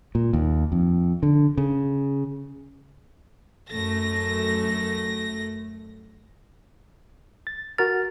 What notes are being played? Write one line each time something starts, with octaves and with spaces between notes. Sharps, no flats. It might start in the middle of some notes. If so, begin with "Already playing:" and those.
A#2
D#2
F2
D3
C#3
F#2 A3 A#6
A6
F#4 A#4 F6 A6